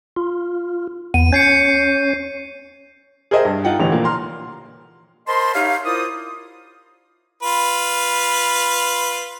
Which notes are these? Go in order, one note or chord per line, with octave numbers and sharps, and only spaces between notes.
F4
E2 B3 D#7
C#4 C#5 G6 C7 C#7
G#4 A#4 C5 D#5 E5 G5
G2
D#4 F4 F#5 G5
A1 D3 E3 G4 F7
A#2 F3 A#3
A#5 C6 F6
A#4 C5 D#5 A5 B5 C6
D#4 G4 C#5 E5 F5
E4 F4 A#4 C5 D5 D#6
F4 B4